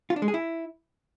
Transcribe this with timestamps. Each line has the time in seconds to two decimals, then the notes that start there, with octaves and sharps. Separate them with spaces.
0.10 F4
0.16 D4
0.22 G#3
0.28 G#4
0.34 E4